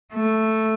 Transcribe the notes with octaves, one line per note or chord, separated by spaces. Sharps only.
A3